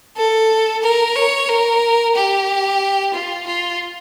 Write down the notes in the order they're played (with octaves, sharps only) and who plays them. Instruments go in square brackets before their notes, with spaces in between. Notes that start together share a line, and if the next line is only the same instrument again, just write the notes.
[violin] A4
A#4
C#5
A#4
G4
F4
F4